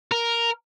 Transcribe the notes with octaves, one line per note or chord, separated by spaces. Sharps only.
A#4